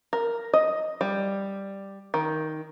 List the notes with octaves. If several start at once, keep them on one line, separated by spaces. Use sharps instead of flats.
A#4
D#5
G3
D#3